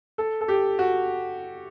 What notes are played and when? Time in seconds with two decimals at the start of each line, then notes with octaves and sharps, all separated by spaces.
0.18 A4
0.41 A4
0.48 G4
0.79 F#4